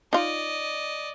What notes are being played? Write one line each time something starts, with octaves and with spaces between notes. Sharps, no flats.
D#4 F4 D5 D#5